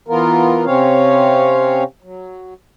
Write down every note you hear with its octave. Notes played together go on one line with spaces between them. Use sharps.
E3 B3 F4 A#4
C3 C4 C#4 C#5 F5
F#3